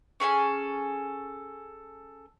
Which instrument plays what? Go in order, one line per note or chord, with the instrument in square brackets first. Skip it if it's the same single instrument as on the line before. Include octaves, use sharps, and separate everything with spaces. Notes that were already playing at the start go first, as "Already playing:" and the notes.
[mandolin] C#4 G#4 A4 G#5